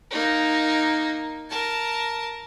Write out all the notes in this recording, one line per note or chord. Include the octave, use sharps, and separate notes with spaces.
A#3 D#4
A#4 A5